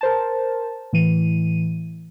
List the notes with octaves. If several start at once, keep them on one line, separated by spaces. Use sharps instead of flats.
A#4 C5 A5
A2 E3 D#7